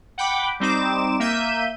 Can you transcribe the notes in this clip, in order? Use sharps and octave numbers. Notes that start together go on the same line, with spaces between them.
F#5 G5 B5 D6
G3 C4 D#4 D6 E7
A#3 E5 G6 D#7